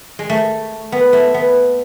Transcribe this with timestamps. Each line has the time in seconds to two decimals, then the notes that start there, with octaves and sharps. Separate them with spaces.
0.19 G#3
0.30 A3
0.92 B3
1.13 A3
1.34 B3